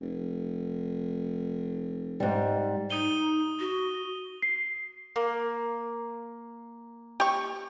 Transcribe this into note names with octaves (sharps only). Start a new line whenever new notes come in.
F1
G#2 G3
D#4 D#6 D#7 G7
F#4
C7
A#3
G4 C#6